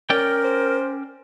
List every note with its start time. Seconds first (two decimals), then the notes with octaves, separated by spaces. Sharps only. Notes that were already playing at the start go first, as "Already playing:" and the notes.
0.10 C#4 A#4 D5 G5
0.44 C5